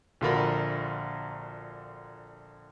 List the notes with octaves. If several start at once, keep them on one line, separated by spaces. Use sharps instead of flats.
A#1 D3 F4 F#4 A#4 B5